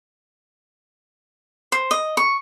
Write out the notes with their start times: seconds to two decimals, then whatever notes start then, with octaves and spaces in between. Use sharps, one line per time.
1.72 C5
1.91 D#5
2.17 C#6